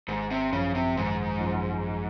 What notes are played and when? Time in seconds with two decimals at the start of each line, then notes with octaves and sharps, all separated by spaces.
0.08 G#1 G#2
0.31 C3
0.53 F#2 C#3 F3
0.75 C3
0.97 G#1 G#2
1.41 F#2 F3